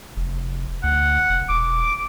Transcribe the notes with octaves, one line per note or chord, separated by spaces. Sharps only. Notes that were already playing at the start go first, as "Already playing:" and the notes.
F1
D2 F#5
F1
E1 D6